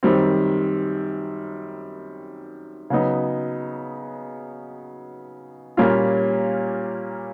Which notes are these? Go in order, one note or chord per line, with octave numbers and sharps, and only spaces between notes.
F#2 D#3 G3 C4
C#3 F#3 B3 D#4
A#2 G3 A#3 C#4 F4